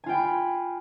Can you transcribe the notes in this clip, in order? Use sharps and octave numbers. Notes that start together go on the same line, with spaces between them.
F4 G5 G#5 B5